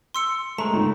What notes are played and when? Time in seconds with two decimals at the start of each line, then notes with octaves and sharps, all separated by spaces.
0.14 C6 E6 C#7
0.58 G#3 A3 A#5
0.73 C#2 G#2